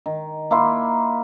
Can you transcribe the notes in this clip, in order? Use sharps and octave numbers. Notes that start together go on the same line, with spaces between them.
D#3
A#3 E4 C6